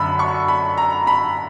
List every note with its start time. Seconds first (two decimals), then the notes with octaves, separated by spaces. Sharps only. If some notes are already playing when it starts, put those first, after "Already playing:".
Already playing: F#2 D3 F#3 B5
0.19 C#6
0.48 B5
0.78 A#5
1.07 B5